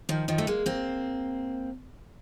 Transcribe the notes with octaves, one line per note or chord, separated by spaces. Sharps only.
D#3 F3
D#3 F3
A3
G#3 A#3
A#3 C4